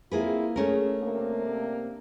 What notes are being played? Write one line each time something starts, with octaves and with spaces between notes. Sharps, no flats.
A#3 C4 E4 F4 G#4 B4
A3 C#4 G#4 A#4
C3 A#3 D4